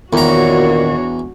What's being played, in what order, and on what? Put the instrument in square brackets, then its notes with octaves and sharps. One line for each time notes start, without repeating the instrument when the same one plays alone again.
[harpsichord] E2 A#5 [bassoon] A#2 [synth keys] D#3 [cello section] D4 F#4 C#5